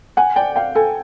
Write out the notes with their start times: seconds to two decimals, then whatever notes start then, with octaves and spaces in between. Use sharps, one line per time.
0.17 F#5 G#5
0.36 D5 G5
0.56 F5 G5
0.75 A4 G#5